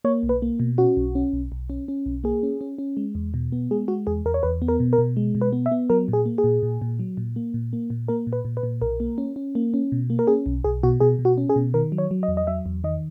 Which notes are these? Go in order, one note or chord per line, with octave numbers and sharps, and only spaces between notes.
A#3 C#5
B1
B4
A#3
B2
C#4 F#4
B1
C#4
B1
B1
C#4
C#4
B1
A#3 G#4
C#4
C#4
C#4
G#3
E2
B2
B3
G#3 G#4
G#3 F#4
E2 G#4
E2 A#4
C#5
E2 B4
B3
A#4
B2
A#4
B2
G#3
B2
B4
B3
E5
B3
F#3 A#4
A#2
G#4
A#3
G#4
A#2
A#2
A#2
F#3
A#2
A#3
A#2
A#3
A#2
A#3 A#4
A#2
B4
A#2
B4
A#2
B1 A#4
A#3
C#4
C#4
A#3
C#4
B2
A#3
A#4
C#4 G#4
B1
B1 G#4
B2 F#4
B2 G#4
B2
F#4
C#4
G#4
B2
D#3 A#4
F#3
C#5
F#3
D#5
E2
D#5
F#3 E5
E2
D#3 D#5